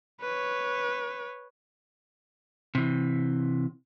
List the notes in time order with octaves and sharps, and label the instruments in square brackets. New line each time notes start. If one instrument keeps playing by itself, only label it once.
[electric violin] B4 C#5
[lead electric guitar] C3 E3